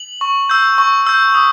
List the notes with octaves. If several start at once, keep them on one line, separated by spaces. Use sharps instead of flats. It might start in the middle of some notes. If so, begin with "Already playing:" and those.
Already playing: F#7
C#6
E6 G6
C#6
E6 G6
D#6